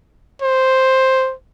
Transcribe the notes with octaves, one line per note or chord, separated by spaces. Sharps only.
C5